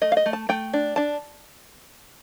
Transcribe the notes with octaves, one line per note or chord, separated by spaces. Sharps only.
A3 D#5
F5
D#5
A3
A5
A3 G5
D4
D4 A5